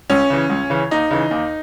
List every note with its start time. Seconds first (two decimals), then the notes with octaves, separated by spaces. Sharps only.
0.10 C#2 C#4
0.30 C#3 E3
0.50 C#2
0.70 C#3 E3
0.91 D#2 D#4
1.11 C#3 E3
1.31 D#2